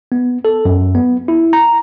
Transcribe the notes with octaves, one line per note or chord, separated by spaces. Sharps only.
B3
A4
F#2
B3
E4
A#5